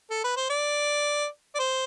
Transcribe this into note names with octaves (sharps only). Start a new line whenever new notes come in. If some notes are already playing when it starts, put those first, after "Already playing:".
A4
B4
C5
D5
D5
C5